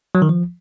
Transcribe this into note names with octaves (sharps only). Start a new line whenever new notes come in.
F#3
D#3
F3